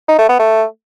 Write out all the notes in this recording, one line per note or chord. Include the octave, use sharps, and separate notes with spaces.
D#4
A3
B3
A3